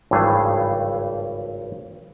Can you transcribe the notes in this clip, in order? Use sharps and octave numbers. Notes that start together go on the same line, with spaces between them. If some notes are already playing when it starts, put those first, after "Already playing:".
G#1 C#2 G2 E3 A3 G#4